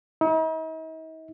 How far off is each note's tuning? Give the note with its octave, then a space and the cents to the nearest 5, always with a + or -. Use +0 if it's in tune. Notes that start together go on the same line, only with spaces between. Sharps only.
D#4 +45